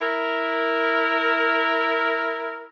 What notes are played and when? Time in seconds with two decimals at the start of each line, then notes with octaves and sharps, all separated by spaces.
0.01 E4 A#4